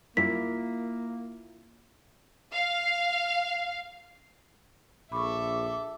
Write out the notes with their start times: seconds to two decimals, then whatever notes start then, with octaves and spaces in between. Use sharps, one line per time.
0.17 F#2 G3 A#3 E4 F4 A#4 B6
2.52 F5
5.12 A#1 A4 E5 B5 C#6 D6